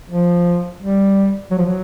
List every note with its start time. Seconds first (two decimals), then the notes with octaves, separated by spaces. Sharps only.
0.10 F3
0.80 G3
1.51 F#3
1.58 F3
1.65 F#3